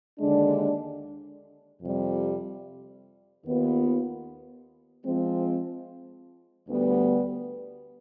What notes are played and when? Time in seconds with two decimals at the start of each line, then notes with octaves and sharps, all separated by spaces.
0.19 D#2 D3 G#3 D4
1.81 F2 C3 G3
3.43 D#2 D#3 B3 F4
5.05 F3 G#3 C4
6.67 D2 D3 G3 B3